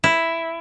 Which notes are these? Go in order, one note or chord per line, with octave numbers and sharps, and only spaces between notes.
E4